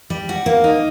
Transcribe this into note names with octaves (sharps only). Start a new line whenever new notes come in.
G3
F#4
A#3
D#4